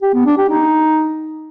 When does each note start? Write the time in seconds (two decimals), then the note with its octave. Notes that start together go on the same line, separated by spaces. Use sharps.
0.02 G4
0.14 B3
0.26 D4
0.38 G4
0.50 D#4